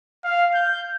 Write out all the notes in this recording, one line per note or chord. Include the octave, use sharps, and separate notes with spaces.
F5
G6